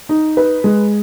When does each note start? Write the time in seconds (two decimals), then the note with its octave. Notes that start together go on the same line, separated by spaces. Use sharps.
0.09 D#4
0.37 B4
0.64 G#3